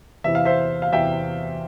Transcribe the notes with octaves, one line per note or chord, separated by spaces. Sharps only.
E2 C3 E3 E5
F5
C5 E5
F5
E2 C3 E3 E5 G5